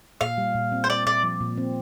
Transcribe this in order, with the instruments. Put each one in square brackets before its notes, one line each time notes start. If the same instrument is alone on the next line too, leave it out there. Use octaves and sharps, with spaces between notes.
[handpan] A#2 [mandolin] F5
[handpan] G3
A#2
C4
[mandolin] C5
[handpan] A#3 [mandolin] D5
[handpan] A#2 [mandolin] D5
[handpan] F3
A#2
C4